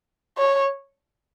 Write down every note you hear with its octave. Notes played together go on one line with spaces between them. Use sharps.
C#5